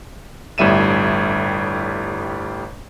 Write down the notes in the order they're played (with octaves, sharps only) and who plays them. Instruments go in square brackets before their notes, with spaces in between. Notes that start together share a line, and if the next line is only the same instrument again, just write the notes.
[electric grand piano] G1 A2 G3 E5 D#7 E7